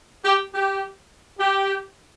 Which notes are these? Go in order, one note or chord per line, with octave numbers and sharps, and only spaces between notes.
G4
G4
G4